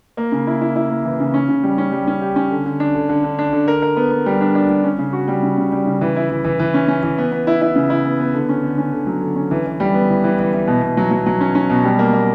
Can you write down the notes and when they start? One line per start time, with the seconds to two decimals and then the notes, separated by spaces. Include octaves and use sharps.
0.17 A#3
0.32 C#3
0.47 E4
0.61 E4
0.76 E4
0.90 A#3
1.05 E3
1.20 C#3
1.34 C#4
1.49 C#3
1.63 G3
1.78 C#4
1.92 G3
2.07 C#4
2.21 G4
2.36 C#4
2.51 D3
2.66 D3
2.80 D4
2.95 D3
3.09 D3
3.24 D3
3.39 D4
3.53 D3
3.68 A#4
3.82 A#4
3.96 B3
4.12 B3
4.26 G3
4.41 D4
4.55 D4
4.69 G3
4.84 C#4
4.98 C#3
5.13 F#4
5.28 G3
5.43 C#3
5.57 C#3
5.72 G3
5.86 C#3
6.01 E3
6.16 E4
6.30 E3
6.44 E3
6.59 E3
6.74 C#4
6.88 C#4
7.03 E3
7.18 B3
7.32 B3
7.47 E4
7.62 E4
7.76 C#3
7.90 E4
8.05 B3
8.20 B3
8.34 D3
8.49 C#4
8.63 D3
8.78 C#4
8.92 D3
9.07 F#3
9.21 D3
9.36 C#4
9.51 E3
9.66 E3
9.80 G3
9.94 B3
10.09 E3
10.24 E3
10.39 E3
10.53 E3
10.67 B2
10.82 B2
10.97 F#3
11.11 F#3
11.26 F#3
11.41 C#4
11.55 C#4
11.70 B2
11.84 G3
11.99 A#3
12.13 A#3